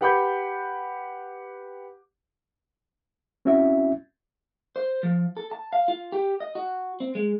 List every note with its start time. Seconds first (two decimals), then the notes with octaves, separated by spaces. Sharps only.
0.01 G4 B4 F#5 B5 D6 G6
3.45 C4 C#4 E4 F#4 E5
4.76 C5
5.03 F3
5.37 A4
5.51 A5
5.73 F5
5.88 F4
6.12 G4
6.40 D#5
6.55 F#4
7.00 C4
7.15 G#3